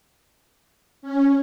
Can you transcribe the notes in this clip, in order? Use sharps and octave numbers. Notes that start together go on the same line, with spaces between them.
C#4